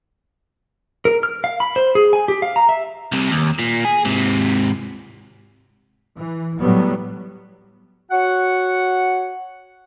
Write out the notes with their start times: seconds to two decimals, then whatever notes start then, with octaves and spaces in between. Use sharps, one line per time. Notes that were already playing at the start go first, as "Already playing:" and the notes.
1.05 A#4
1.23 F6
1.44 F5
1.60 B5
1.76 C5
1.95 G#4
2.13 G#5
2.28 G4
2.42 F5
2.56 A#5
2.69 E5
3.12 C2 C3
3.31 D#2
3.59 A#2
3.85 G#4
4.05 G#2 C3
6.17 E3
6.59 A2 F#3 G3 B3
8.11 F#4 C#5 F#5